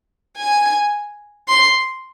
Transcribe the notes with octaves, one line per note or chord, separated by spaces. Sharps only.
G#5
C6